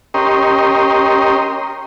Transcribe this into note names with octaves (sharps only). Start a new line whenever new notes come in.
C#4 G4 A#4 D#5 C6